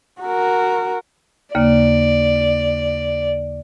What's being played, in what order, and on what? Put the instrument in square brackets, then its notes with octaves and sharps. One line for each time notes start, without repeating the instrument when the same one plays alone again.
[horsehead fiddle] F#4 A#4
[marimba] D#2 C#3 A#3 [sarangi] D5